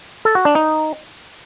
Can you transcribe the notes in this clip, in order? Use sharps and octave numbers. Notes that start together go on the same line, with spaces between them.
A4
F#4
D4
D#4